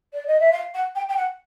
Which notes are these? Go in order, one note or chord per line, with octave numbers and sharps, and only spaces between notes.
D5
D#5
E5
F5
F#5
G5
G5
F#5